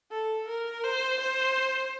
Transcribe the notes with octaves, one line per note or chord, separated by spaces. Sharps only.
A4
A#4
C5
C5